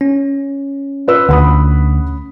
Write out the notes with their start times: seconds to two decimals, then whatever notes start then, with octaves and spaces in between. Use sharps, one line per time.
0.01 C#4
1.08 F4 B4 E6
1.29 D2 F#5 B5 D#6